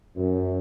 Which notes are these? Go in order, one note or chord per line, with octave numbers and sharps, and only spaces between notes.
F#2